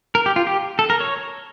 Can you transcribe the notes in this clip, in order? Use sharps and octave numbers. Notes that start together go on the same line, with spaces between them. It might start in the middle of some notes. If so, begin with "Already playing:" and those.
A#4
G4
F4
G4
A4
A#4
C#5